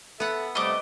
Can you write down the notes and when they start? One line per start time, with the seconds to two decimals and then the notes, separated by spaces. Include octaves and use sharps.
0.20 B3 A4 E5 F#5
0.55 C3 G3 A3 D#5 D6